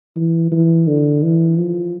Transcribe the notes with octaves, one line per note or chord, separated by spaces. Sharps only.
E3
E3
D3
E3
F3